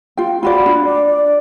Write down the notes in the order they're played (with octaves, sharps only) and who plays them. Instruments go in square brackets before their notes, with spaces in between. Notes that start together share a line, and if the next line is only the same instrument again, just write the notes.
[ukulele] F4 G5
[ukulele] F4 F#4 D5 [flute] B5
[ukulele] D4
[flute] D5
D5